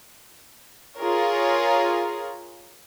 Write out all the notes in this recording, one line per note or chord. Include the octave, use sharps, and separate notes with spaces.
F4 G#4 A#4 C#5